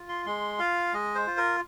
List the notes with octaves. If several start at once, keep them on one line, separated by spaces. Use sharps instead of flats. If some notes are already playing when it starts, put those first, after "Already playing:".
Already playing: F4
C6
G#3 C6
F4 F5
G#3 D#5
C5
F4
A#4